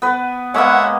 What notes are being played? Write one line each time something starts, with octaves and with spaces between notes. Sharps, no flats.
B3 B4
G#3 A#3 B3 C#5 E5 F#5